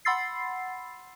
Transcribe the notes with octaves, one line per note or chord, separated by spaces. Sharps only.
F#5 B5 C6 E6 A6 C7